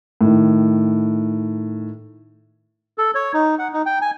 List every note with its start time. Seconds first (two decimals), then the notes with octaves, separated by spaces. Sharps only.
0.21 A2 D#3
2.98 A4
3.15 C#5
3.34 D#4
3.59 F#5
3.73 D#4
3.86 G5
4.01 G#5